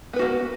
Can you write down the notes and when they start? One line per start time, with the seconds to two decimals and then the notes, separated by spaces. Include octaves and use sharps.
0.13 B3
0.16 B4
0.19 F#4
0.22 A#3